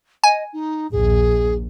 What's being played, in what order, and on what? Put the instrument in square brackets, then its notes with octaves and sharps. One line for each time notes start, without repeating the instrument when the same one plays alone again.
[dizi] D#5 [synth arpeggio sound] G#5
[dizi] D#4
[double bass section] A#1 D#2 [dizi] G#4